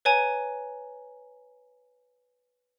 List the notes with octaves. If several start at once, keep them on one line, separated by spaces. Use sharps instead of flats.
B4 C#5 G#5 A#5